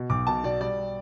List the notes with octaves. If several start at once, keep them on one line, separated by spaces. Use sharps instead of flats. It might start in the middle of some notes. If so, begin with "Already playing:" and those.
Already playing: B2
B1 D6
B2 A5
B2 D5
G3 D5
G3